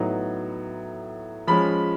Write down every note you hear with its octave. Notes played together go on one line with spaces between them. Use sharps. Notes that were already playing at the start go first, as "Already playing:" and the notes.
Already playing: A2 F#3 B3 D#4
F3 G#3 C#4 B5